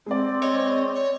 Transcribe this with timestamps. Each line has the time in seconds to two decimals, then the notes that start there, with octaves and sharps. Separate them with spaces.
0.06 G#3 C4 D5
0.42 C#5 D#5
0.94 C#5